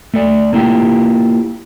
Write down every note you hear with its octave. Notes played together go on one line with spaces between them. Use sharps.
A3 A4 D5
A#3 E4 F4 G4